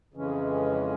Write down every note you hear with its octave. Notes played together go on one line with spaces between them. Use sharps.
F2 C#3 E3 G#3 C#4